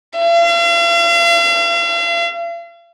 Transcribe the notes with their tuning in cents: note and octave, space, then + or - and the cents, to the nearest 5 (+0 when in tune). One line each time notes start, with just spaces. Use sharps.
F5 -40